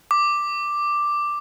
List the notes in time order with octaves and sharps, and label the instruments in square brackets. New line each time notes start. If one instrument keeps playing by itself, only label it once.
[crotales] D6